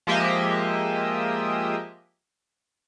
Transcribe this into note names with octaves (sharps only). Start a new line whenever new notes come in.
F3 G#3 A#3 G4 D#5 E5